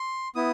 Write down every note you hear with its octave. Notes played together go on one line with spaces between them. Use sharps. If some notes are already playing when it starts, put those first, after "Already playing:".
Already playing: C6
B3 E4 D#6